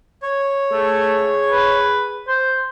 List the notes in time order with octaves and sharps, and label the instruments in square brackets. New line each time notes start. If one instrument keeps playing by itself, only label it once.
[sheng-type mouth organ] C#5
[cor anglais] A3 [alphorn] G#4
[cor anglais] B4
C5